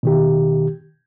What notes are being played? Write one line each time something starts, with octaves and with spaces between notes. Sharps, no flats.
B2 D#3 G4